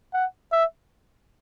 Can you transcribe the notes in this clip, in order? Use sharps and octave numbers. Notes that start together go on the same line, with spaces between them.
F#5
E5